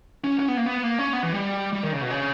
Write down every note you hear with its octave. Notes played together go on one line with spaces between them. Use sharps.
C#4
C#4
B3
A#3
B3
A#3
C#4
B3
E3
G3
G3
D#3
C#3
B2
C#3